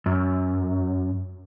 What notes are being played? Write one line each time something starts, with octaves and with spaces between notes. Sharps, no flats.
F#2